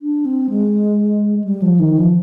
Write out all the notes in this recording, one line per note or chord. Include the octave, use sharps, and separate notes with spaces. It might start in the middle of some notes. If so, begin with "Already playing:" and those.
D4
C4
G#3
G3
F3
D#3
F3